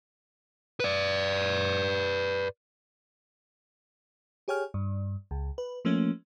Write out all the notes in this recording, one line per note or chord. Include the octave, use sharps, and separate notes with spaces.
B4 D5
G4 G#4 C#5 G5 G#5 F6
G2
C#2
B4
F3 A3 A#3 C#4